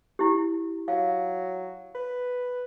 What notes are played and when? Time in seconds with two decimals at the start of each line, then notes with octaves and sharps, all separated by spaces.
0.19 E4 G4
0.88 F#3 F5
1.95 B4